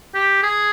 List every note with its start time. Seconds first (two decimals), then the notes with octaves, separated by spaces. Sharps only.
0.15 G4
0.43 G#4